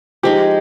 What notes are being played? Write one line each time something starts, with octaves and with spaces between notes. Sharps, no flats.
F3 G#3 D#4 G4